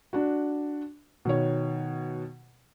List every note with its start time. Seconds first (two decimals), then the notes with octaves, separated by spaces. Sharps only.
0.13 D4 F#4
1.25 B2 D#3 C#5